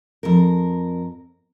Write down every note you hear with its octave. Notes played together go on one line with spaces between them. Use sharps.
F2 A#4